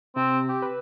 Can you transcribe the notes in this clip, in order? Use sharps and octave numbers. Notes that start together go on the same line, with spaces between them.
C3 C4
G4
B4